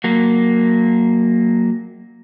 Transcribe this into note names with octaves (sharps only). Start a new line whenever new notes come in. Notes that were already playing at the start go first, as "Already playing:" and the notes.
F#3 A#3